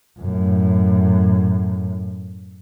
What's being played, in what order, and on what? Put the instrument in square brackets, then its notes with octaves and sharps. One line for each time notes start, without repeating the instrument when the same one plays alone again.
[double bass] F#2 A2